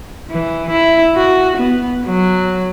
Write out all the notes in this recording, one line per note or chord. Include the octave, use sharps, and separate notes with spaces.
E3
E4
F#4
B3
F#3